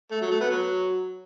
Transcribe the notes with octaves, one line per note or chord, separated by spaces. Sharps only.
A3
F#3
A3
B3
F#3